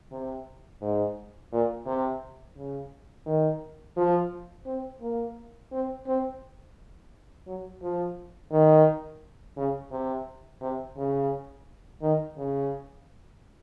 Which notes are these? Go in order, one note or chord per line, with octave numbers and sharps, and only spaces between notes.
C3
G#2
A#2
C3
C#3
D#3
F3
C4
A#3
C4
C4
F#3
F3
D#3
C#3
C3
C3
C#3
D#3
C#3